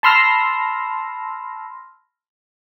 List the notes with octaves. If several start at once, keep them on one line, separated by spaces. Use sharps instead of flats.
A5 B5 C6 E6 F6 A#6